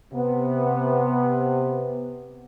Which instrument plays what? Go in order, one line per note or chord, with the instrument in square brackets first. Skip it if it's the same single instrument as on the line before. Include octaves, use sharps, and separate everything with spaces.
[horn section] C3 B3